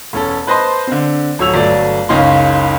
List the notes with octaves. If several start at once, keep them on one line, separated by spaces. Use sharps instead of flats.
E1 C#4 A4
B4 C5 D#5 A5 C6
D3 C4
D#1 F#3 C#5 E6 F7
G1 F#3 A3 D5
F#1 C#2 C#4 D#4 F5 C6